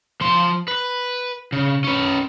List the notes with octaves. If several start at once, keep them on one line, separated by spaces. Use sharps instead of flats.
F3 C6
B4
C#3
C#4 B4